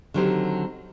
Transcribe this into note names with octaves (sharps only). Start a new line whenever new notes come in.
D3 D#3 F#3 C4 G4 C5